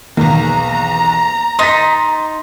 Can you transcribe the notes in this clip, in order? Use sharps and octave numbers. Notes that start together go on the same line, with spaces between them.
B1 E2 D#3 A#3 B3 A#5
D#4 C6 A6 B6